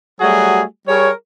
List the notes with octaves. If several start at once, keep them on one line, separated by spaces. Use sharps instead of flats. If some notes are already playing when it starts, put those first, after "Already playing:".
F#3 G3 A3 F#4 G#4
G3 G#4 A#4 C#5